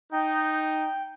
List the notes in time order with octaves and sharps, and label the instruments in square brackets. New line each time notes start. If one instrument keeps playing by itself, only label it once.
[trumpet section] D#4 [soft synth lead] G5